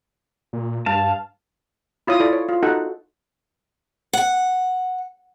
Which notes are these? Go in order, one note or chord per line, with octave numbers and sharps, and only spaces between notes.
A#2
G2 F5 A5
E4 F4 C#5 D#6
E4 A4 D5
C#5
F4
D#4 F#4 A4 F#5
F#5